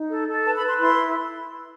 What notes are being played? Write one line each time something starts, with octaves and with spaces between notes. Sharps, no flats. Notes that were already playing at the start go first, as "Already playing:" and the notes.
Already playing: D#4
A4
A4
B4 A5
B5
B4
C6
E4 C6